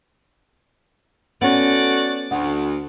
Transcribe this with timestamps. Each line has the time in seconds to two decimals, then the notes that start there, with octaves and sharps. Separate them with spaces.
1.41 A3 B3 C#4 F#4 D5
2.31 D2 F#5